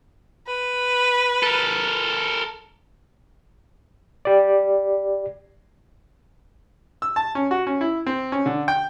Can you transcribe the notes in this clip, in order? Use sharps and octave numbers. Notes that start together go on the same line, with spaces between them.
B4
A4 A#4
G4 D5
E6
A5
C#4
F#4
C#4
E4
C4
C#4
D3
G5